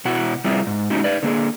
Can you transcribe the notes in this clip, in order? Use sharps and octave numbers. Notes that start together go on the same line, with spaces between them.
B2 E4 F#4 F#5
G3 C4 E4 F4 G#4
G#2
G#3 C#4 D#4 F#4 G4
D#4 B4 D5
D3 A#3 G#4